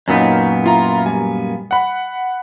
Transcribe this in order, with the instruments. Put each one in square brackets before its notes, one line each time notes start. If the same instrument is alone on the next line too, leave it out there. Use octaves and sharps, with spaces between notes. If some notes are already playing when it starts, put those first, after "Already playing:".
[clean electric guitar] F#2 A#2 B3 [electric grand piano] C#4 D#4
[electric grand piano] E4 F4 A#5
G3 G#5
F#5 B5